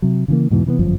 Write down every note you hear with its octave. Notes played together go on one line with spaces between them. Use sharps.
C3 F#3
C#3 E3 A#3
E2 G#2 B2 E3
C3 E3 G#3 B3
G1 F#2 F3